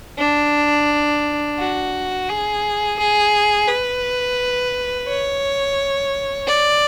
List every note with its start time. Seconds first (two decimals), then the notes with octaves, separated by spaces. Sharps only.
0.18 D4
1.59 F#4
2.29 G#4
2.99 G#4
3.68 B4
5.08 C#5
6.47 D5